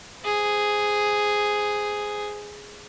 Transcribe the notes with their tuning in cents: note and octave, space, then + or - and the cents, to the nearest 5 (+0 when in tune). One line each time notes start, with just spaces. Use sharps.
G#4 +0 C5 -20